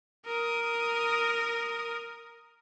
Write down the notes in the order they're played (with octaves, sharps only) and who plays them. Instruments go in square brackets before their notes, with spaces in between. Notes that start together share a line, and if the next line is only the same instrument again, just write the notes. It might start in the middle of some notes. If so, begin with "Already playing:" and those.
[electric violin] A#4 D#6